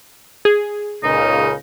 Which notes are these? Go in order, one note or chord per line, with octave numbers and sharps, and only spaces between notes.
G#4
C#2 A#2 C#3 D#4